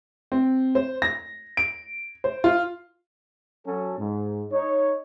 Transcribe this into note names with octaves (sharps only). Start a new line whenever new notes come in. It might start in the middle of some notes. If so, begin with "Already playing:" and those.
C4
C5
A#6
D7
C5
F4
F#3 C#4 A4
G#2
D#4 C#5